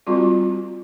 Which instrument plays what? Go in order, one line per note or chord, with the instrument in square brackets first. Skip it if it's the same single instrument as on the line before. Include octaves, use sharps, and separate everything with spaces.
[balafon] G3 C4 F4 F#4